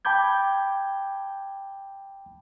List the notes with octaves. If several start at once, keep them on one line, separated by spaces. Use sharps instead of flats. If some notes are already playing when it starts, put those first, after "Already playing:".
G5 A5 B5 D6 G6 G#6